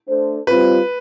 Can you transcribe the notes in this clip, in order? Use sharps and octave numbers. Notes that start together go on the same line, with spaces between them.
A3 D4 A4 C5
G3 C4 F4 B4